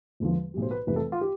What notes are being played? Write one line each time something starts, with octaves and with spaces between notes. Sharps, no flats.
E1 E2 D3 F3
B1 A2 G3
C5
B4
F1 F2 E3 G3 B4
A4
F4
G4